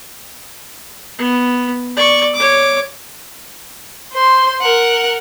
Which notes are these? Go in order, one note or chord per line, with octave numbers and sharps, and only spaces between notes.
B3
D5 C#6
C#5 D6
C5 C6
A#4 F#5